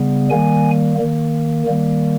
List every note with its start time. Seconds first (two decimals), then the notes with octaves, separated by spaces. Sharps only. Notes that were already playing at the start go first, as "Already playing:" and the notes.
Already playing: C#3 G3 B3
0.30 D#3 G3 A#3 G#5
0.98 D#3 A#3
1.66 D#3 G3 A#3